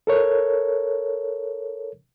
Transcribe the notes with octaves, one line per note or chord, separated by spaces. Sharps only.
A4 A#4 C#5